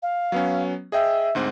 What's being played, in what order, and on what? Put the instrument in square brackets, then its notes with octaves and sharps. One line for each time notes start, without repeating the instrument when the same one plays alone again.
[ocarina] F5
[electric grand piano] F#3 B3 C#4
[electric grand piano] G#4 D#5 G5 [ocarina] E5
[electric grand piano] D2 G#2 C4